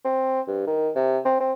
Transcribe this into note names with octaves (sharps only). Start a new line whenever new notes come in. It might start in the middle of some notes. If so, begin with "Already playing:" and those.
C4
G2
D#3
C3
C4
C4